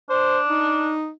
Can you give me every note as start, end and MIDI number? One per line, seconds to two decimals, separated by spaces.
0.10 0.93 62
0.10 0.39 72
0.48 1.10 63